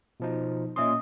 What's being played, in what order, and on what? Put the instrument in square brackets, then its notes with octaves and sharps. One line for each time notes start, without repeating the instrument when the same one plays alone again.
[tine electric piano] B2 F3 D#4
[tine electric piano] A#2 C#4 C6 [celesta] D#5 E5 D#6